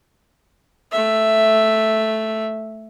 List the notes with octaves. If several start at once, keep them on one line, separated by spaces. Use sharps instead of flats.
A3 E5